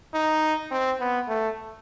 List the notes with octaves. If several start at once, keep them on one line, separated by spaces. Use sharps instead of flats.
D#4
C4
B3
A3